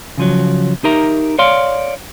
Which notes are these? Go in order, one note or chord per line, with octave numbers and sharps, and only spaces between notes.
C#3 F3 F#3
D#4 G4 A#4 E5 A#5
C#5 D5 F5 C6